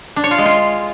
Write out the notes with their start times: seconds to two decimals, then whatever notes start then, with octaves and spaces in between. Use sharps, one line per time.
0.16 D4
0.24 C#5
0.31 F4
0.38 G#3
0.46 F4